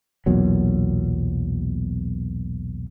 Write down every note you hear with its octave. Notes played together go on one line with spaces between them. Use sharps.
B1 E2 A#2 F#3